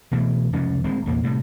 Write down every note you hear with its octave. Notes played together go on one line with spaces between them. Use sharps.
B2 E3 A3
F1 C#2 F3 C#4
D1 D2 G#3 C4
A#1 E2 A#2 A#3
A2 C3 G3